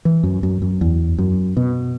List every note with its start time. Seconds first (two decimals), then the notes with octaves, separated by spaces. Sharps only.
0.05 E3
0.23 F#2
0.43 F#2
0.62 F#2
0.81 E2
1.18 F#2
1.57 B2